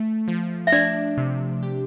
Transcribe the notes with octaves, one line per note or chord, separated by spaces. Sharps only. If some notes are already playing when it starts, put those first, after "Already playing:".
Already playing: A3
F3
E5
D4 D5
C3
G4